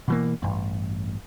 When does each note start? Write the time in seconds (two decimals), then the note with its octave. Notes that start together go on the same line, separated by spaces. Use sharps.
0.08 B2 E3 A#3
0.43 A1 G2